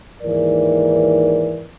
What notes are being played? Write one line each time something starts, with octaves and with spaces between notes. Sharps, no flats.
D#2 G#2 E3 A#4 D5